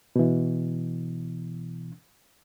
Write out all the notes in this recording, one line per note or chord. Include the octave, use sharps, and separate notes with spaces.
B2 E3